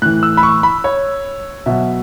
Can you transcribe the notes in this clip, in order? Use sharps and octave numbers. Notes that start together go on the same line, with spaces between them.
A2 E3 F#6
E6
B5
C#6
B5
C#5
B2 F#3 E5